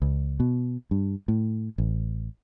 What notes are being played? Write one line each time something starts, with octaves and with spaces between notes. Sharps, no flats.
C#2
B2
G2
A2
A1